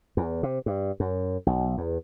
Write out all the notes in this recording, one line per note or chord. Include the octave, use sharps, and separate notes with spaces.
E2
C3
G2
F#2
B1
E2